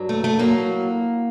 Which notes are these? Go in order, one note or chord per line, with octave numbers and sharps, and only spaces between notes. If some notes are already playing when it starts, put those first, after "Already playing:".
Already playing: G2 F#3
A3
A3
A2 F#3 A#3